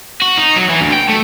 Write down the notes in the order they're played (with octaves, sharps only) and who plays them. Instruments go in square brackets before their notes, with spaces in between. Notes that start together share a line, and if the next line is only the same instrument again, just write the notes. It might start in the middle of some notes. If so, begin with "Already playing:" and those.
[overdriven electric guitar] F#4
D#4
F#3
E3
D2
G5
A3